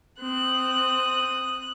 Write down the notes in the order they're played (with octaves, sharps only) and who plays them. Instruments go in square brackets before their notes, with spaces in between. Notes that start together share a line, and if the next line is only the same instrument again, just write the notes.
[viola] C4 [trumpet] D#6 [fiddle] F#6